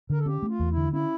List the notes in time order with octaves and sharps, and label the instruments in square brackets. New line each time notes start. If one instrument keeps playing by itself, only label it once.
[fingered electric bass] D3 [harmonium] A#4
[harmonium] A4
[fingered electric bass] C#4 [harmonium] G4
[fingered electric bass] A3
[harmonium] F4
[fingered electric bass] E2
[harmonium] E4
[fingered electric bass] D3
[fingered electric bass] C#4 [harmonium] E4